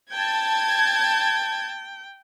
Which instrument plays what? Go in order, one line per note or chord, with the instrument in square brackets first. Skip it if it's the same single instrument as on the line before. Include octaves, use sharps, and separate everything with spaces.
[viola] G5 [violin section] A5 G#6